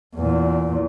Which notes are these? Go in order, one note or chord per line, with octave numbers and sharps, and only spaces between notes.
E2 A#2